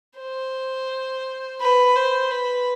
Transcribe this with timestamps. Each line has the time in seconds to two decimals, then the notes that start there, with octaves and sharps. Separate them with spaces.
0.19 C5
1.61 B4
1.96 C5
2.31 B4